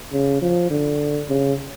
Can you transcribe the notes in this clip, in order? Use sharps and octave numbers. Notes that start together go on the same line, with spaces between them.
C#3
F3
D3
C#3